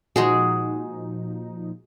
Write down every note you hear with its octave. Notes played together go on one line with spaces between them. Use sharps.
A#2 F3 G#3 D#4 F#4 G#4